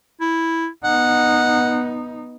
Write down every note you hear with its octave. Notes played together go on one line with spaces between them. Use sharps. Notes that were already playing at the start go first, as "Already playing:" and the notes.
E4
B3 D#4 F#5